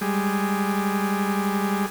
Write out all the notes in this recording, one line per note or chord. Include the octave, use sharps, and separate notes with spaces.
G3 G#3